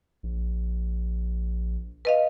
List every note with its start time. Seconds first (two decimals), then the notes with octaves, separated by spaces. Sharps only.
0.23 A#1
2.05 B4 D#5 F5